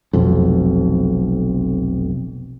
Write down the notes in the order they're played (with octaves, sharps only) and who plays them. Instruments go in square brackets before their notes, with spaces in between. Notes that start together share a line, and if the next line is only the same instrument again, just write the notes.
[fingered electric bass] F1 B1 F2